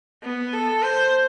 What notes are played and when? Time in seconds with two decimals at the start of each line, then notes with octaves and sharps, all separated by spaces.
0.23 B3
0.53 A4
0.83 C5